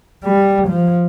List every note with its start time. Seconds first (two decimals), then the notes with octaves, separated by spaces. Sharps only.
0.24 G3
0.68 F3